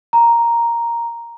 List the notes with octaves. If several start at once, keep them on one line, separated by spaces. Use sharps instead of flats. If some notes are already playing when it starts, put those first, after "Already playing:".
A#5